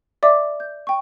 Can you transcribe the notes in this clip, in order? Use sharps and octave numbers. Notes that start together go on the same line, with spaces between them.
D5 E5 D6
G6
G5 C#6